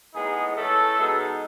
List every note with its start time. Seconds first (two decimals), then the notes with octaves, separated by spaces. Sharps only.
0.14 A2 G#3 B3 D#4 G#4
0.56 E3 A3 C#4 A4
0.97 B2 G#3 B3 D#4